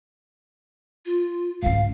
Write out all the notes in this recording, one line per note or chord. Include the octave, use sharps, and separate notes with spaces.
F4
G#2 C#3 F5